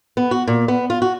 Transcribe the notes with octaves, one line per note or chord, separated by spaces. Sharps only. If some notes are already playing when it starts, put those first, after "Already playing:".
B3
F#4
A#2
B3
F4
F#4